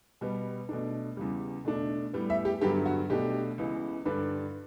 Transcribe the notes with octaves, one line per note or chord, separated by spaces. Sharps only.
B2 G3 B3
B2 A3 D4
E2 C#3 G3
B2 A3 D4
A2 G3 B3
E5
G4
G2 D3 F#3 B3 G4
F#4
B2 A3 D4 G4
C#2 C#3 E3 B3
G2 D3 G3 D4 B4